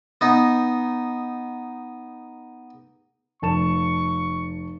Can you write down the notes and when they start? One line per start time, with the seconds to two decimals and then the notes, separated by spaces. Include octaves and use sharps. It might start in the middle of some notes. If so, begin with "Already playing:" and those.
0.21 B3 D#4
3.42 F1 A5 C#6 E7